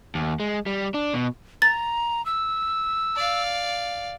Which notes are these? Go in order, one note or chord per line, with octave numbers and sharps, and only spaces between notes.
D#2
G#3
G3
D4
B2
A#5 A6
E6
D5 F5